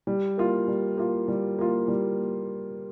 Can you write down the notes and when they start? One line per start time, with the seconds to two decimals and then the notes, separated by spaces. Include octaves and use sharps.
0.07 G3
0.38 A#3 F4
0.68 G3
0.97 A#3 F4
1.28 G3
1.59 A#3 F4
1.88 G3